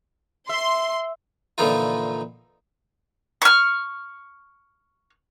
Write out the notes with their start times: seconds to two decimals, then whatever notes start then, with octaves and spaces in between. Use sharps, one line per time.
0.49 E5 C6
1.58 A#2 D3 E3 F3 D#4 F4
3.42 C#6 F6